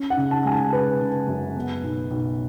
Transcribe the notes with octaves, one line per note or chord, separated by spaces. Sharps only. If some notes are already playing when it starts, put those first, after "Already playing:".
Already playing: C#4
F#5
C#3
A5
G#3 G#5
A5
C#3 B4
C#3
F#2
B3
B1
B1